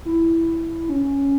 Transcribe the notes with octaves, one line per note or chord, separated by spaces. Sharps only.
E4
C#4